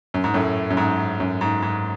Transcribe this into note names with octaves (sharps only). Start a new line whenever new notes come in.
F#2
G#2
F#2 A2
F#2
G#2
F#2
G#2
G#2